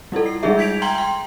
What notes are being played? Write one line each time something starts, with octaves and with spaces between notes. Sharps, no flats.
G3 E4 F4 A4
C7
G3 G#3 D#4 F4 G#4 E5
G6 G#6 B6 D7 F7
G5 A#5 C6 G#6 F#7 G7
G5 C6